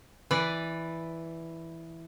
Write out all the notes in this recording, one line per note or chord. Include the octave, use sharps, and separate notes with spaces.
E3 B4 D5